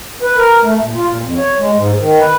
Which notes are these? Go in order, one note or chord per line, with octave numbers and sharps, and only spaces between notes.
B4
A#4
A3
A#2
F4
A#2
F2
C#5
G#3
G#2
D#3
B4